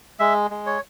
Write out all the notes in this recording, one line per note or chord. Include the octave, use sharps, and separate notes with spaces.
G#3 E5
G#3
C#5